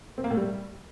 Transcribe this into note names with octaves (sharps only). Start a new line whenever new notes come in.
C4
A#3
A2
G3